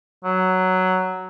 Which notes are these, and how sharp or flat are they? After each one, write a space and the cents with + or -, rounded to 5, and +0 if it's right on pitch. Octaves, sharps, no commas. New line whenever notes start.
F#3 +5